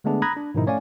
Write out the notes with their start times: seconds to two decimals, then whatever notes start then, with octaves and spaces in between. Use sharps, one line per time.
0.04 D3 G#3 A3 B3 D4 G#4
0.22 A#5 B5 D#6 F#6 G#6 A#6
0.37 D4
0.55 G#2 B2 D#3 F3 D#4 E4
0.66 A3 C#4 C#5 D5 F5 G#5